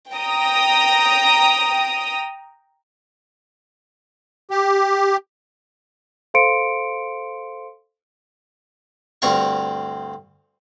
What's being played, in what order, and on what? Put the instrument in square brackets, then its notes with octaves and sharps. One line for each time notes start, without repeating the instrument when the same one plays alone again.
[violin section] G5 A#5 D#6
[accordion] G4
[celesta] A4 C5 F5 C6 C#7 D7
[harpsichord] D2 G2 C4 F5 A#5 C#6